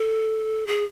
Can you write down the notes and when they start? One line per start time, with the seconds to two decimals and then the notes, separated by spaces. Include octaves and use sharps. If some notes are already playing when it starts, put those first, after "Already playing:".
Already playing: A4
0.67 G#4